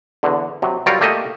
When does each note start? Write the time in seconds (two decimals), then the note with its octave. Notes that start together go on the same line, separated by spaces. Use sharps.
0.23 E2 D3
0.62 C3 F#3
0.86 F#3 G3 F4 A#4 C#5 D5
1.01 A3 A#3 G4 A4 D#5